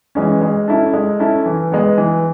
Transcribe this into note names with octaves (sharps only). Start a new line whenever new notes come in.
E3 G#3 C#4
G#3
C#4 E4 A4
G#3
C#4 E4 A4
E3
G#3 B3
E3